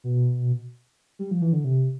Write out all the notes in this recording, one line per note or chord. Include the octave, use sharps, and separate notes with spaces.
B2
G3
F3
E3
D3
C3